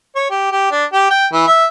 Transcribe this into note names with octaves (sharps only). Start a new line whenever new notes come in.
C#5
G4
G4
D4
G4
G5
E3
E5